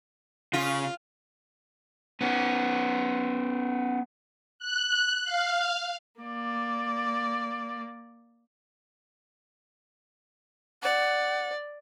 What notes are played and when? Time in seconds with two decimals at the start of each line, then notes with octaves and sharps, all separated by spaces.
0.53 C#3 F4
2.21 B3 C#4
4.59 F#6
5.24 F5
6.21 A#3 D5
10.83 D5 F#5